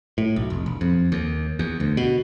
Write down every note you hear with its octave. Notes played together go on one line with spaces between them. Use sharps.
A2
B1
F1
E1
F2
D#2
E2
D2
B2